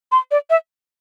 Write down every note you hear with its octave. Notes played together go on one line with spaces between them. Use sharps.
C6
D5
E5